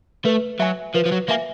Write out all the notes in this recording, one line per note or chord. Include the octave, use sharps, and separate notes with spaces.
A3 B4
F#3 E5 G#5
F3 B4
F3
F#3
A#3 E5 G#5